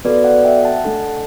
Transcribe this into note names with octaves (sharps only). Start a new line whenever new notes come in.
B3 F#4 A4 B4 D5
D5 F#5
E5 G5
F#5 A5
A3 D4 A4